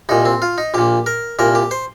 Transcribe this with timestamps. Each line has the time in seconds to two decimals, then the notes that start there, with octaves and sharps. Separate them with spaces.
0.09 C2 A#2 D#4
0.25 C4
0.42 F4
0.58 D#4
0.74 A#1 A#2 G4
1.06 A#4
1.39 C2 A#2 A#4
1.55 G4
1.71 C5